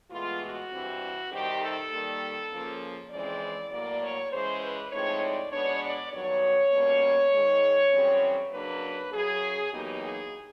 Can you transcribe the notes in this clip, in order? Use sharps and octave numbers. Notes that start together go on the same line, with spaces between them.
A2 E3 G#3 B3 F4
F#4
G2 E3 G3 C4
C3 D#3 G3 C4 D#4 G4
A4
D#3 G3 A#3
C#3 F3 A#3 C#4
F2 C#3 E3 G#3 C4 D5
A2 F#3 A#3 D5
C#5
C#3 E3 G#3 C5
B4
A2 F3 G#3 C4 D#4 C#5
D5
B2 G#3 B3 D4 C#5
D5
G2 D#3 F#3 B3 C#5
B2 G3 A#3 C#4
G#2 D#3 G#3
F#2 C#3 E3 G3 C4
C#3 F#3 A#3 D4 B4
F#2 C#3 F#3 G#4
E2 B2 F#3 A#3 D#4 G4
G#4